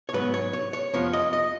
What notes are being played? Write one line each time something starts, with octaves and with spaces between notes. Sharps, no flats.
C#5
G#2 F#3 B3 B4
C#5
C#5
C#5
F2 F3 B3 C#5
D#5
D#5